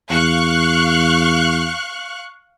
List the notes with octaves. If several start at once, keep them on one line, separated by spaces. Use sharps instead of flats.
E2 F5 C#6 F#6